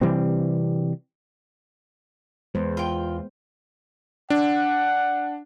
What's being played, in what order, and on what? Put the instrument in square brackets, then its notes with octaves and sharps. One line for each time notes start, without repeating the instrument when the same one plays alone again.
[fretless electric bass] C3 E3 G3 C4
[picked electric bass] E2 [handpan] G#3 B3 C5
[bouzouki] F4 G5
[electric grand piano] D4 [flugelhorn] F#5